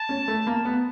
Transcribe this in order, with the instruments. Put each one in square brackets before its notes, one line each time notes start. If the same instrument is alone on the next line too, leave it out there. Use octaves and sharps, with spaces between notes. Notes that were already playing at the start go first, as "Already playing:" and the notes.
Already playing: [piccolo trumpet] A5
[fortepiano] C#4
A3
A#3
B3